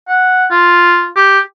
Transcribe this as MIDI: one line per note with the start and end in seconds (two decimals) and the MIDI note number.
0.08 0.45 78
0.51 1.08 65
1.16 1.39 67